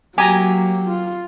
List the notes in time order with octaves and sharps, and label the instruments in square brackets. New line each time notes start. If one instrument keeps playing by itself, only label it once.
[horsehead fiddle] F#3 A#3 [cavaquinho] G4 [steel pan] G#5 A#5
[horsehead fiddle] F4